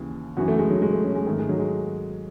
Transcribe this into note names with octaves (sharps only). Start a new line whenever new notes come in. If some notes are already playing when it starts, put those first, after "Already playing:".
Already playing: D#2 C#3 E3
F#2 E3 F#4
A3
G#3
F#3
G#3
A3
C#4
G#3
G#2 D#3 A3
G#3
F#3
G#3